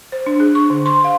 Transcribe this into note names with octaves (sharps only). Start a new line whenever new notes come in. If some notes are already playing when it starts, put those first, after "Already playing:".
C5
D4
G#4
C#6
D3
C6
F5